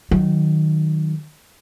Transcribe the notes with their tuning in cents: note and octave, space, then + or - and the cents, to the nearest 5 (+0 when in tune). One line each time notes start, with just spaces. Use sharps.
D#3 +0 F#3 +0